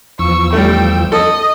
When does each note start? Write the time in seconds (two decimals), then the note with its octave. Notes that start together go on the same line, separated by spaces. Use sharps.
0.19 E2 F3 C#6 E6
0.53 G3 A3 G5
1.12 A4 D#5